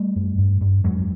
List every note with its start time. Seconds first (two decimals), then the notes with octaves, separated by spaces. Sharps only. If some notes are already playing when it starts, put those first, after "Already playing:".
Already playing: G3 A3
0.16 F#2
0.38 G2
0.61 G2
0.84 F2 F#3 G#3